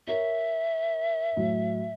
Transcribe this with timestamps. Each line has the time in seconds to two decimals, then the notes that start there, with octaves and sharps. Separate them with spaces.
0.07 A#4 C#5 E5
1.37 A2 F#3